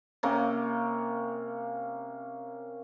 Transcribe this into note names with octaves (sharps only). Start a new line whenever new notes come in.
C3 A#3 C#4